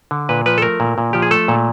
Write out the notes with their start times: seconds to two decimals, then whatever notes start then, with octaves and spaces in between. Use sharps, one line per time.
0.11 D3
0.29 A#2 B4
0.46 F3 B4
0.58 A4
0.62 A3 A#4
0.80 A#2
0.98 A#2
1.13 F3 G4
1.22 G#4
1.31 A3 A4
1.48 A#2